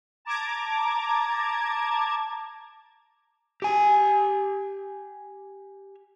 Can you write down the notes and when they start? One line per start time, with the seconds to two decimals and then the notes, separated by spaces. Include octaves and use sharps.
0.25 A5 A#5 D6 G#6
3.62 G4 G#5